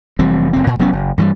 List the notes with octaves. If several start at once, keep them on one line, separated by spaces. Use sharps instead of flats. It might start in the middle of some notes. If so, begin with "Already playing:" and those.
F1 E3 G3 C4
F#1 C4
A#2
F1 F#3 B3 C#4
F#1
G2 E3 F#3 G3